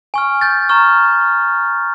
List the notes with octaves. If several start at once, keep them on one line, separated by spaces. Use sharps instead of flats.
G#5 C#6 F6
G6 A6
A#5 C#6 F6